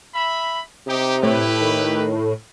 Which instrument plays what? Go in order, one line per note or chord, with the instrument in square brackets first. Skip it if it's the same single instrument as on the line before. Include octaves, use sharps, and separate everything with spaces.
[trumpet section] E5 B5
[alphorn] C3 [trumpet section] D#4 G4
[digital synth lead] A2 [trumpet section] E4 G4 B4
[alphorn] D#3